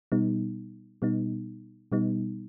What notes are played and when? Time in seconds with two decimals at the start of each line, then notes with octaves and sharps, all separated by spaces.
0.12 B2 G3 B3 D#4
1.02 B2 G3 B3 D#4
1.92 B2 G3 B3 D#4